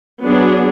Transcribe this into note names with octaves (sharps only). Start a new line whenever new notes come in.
F#3 B3 D4 G#4